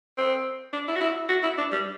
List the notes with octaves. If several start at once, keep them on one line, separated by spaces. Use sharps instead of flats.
C4
D4
E4
F#4
E4
F#4
E4
D4
G3